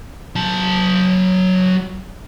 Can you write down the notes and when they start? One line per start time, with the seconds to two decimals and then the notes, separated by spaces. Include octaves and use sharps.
0.36 F#3 A5